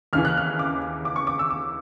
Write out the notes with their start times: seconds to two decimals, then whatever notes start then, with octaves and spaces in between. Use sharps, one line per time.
0.13 D#2 C#3 E3 F6
0.25 F#6
0.37 F6
0.59 D6
1.05 D6
1.16 C#6
1.27 D6
1.39 E6
1.50 D6